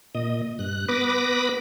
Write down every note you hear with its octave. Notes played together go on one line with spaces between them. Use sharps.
A#2 D#5
G2 F#6
B3 B4 B5 D6 A#6